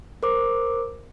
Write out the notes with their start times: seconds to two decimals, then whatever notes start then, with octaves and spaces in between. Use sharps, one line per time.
0.23 A#4 C5 D6